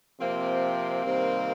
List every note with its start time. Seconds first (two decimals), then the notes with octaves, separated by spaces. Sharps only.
0.20 C3 F3 A#3 C4
1.04 C3 D#3 G3